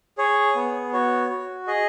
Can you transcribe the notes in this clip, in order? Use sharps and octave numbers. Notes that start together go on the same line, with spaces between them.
G#4 C#5
B3
F#4 C#5
F#4
G#4 D#5